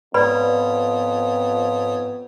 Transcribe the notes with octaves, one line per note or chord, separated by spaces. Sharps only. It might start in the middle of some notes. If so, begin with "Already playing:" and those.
F2 G#2 B3 B4 C#5 D5 B5 D#6